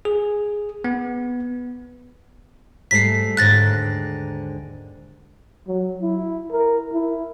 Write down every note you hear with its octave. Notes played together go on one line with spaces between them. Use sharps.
G#4
B3
G#2 G3 A3 B6 C7
D#2 G#2 D3 F#6 A6 A#6
F#3
E4
A#4
E4